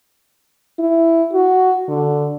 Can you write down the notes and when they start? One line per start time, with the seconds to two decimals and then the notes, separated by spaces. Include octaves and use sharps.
0.79 E4
1.33 F#4
1.89 D3